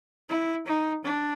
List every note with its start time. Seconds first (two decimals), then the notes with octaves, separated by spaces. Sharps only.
0.29 E4
0.66 D#4
1.04 D4